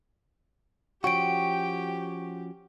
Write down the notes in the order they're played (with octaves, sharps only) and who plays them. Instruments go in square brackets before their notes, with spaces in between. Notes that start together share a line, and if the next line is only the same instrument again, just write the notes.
[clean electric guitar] F3 C#4 F#4 [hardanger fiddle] G4 [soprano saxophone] G5 [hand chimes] C#6 D7